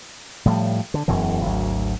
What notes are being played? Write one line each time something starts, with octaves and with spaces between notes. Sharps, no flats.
A2 F3 G3
D3
E1 F#2 B2 E3
G#1 D2 F#3